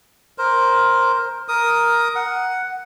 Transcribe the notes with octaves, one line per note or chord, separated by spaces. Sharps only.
A#4 C5
A#4 D#6
F#5